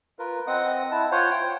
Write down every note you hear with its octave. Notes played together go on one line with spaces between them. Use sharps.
F4 A#4 B4
C4 D#5 F#5 D#6
E4 A5
F4 C5 C#5 F#5
C#5 G5
C5